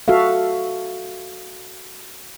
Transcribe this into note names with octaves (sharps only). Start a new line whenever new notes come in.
F#4 A4 E5 F5